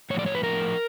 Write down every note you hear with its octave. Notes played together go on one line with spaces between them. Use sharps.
A2 F3 C#5 D5
C#5
B4
A2 F3 A#4